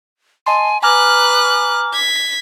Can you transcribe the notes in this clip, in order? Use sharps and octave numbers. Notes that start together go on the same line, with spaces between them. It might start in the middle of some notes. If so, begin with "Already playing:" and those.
D#5 G#5 A5 C6
B4 G#5 A#5 D6 F6 F#6
G#6 B6